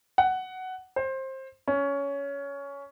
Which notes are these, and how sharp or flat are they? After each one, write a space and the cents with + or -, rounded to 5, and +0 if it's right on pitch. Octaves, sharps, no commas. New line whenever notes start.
F#5 +10
C5 +20
C#4 +15